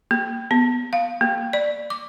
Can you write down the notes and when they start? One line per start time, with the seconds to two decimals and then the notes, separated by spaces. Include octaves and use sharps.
0.11 A#3
0.51 B3
0.93 F5
1.21 A#3
1.53 D5
1.90 D6